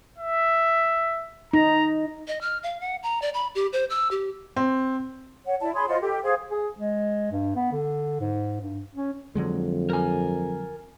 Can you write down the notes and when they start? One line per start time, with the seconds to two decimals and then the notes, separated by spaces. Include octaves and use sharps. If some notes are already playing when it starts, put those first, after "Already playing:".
0.18 E5
1.53 D#4 A#5
2.28 D#5
2.41 F6
2.63 F5
2.81 F#5
3.03 A#5
3.22 D5
3.34 B5
3.55 G4
3.73 C5
3.90 E6
4.11 G4
4.56 C4
5.46 C#5 F#5
5.61 E4 D5 A5
5.73 G#4 C#5 B5 C6
5.88 F4 C5 D#5 F#5
6.00 G4 A4
6.23 G#4 C5 F5
6.51 G#4
6.79 G#3
7.32 G2
7.56 B3
7.72 D3
8.20 G#2
8.61 G2
8.95 C#4
9.35 F2 D3 F#3 G#3
9.90 A#4 G#5